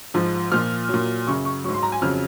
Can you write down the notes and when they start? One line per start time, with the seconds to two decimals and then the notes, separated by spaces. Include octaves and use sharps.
0.14 G#2 F3
0.52 A#2 F3 F6
0.89 A#2 F#3
1.27 F#2 C#3 F#3 C#6
1.45 C#6
1.64 F#3 C#6
1.68 G#2
1.74 C6
1.83 A#5
1.92 G#5
2.02 F2 C#3 F#3 F6